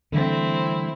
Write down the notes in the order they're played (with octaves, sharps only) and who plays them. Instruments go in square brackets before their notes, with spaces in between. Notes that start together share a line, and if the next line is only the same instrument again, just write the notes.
[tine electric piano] D3 [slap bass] E3 G3 A3 [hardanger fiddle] C4 E4